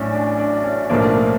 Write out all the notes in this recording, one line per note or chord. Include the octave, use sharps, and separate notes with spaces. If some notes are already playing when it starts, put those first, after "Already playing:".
Already playing: A1 A2 F#3 C#4 D4 E4
D4
D4
C#4
B1 A2 F3 A#3 D4